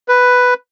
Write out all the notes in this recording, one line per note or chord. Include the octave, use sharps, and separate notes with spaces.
B4